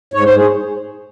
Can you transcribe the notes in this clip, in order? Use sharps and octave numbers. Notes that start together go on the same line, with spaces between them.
G#2 C#5
G#2 C5
G#4